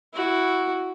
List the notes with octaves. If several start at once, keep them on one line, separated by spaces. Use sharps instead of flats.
E4 F#4